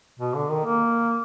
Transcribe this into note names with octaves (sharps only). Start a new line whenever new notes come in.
B2
D3
D#3
A#3